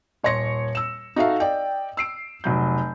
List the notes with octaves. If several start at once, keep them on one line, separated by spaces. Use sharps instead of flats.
D#1 C#5 C6 A#6 C#7
E6 E7
D#4 F#4 A4 E5 F5
D5 D#5 G5
E6 C7 D7
F1 F#3 G6